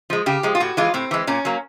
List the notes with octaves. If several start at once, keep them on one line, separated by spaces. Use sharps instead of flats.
F3 G#3
C#3 G4
F3 G#3
F4
A2 F#4
E3 G#3 F4
A2 C4
E3 G#3
A#2 C#4
F#3 A#3